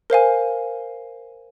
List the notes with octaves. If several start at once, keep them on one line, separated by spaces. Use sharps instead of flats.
A#4 C5 F5 G#5